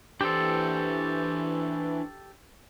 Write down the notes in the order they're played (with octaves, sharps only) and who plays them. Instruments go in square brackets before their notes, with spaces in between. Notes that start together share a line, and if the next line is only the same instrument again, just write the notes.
[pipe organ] E3 [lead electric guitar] D4 C5 [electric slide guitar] G4 A4